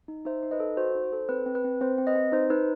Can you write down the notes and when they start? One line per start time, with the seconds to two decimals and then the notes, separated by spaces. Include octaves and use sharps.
0.08 D#4
0.25 D#4 C5 E5
0.43 D#4
0.51 B4 D#5
0.60 A4
0.77 F#4 C5
0.95 D#4
1.04 C5
1.13 A4
1.29 C4 B4
1.46 C4
1.55 B4
1.64 C4
1.81 C4 C5
1.98 C4
2.07 B4 D#5
2.16 C4
2.32 D#4 C5
2.50 D#4 B4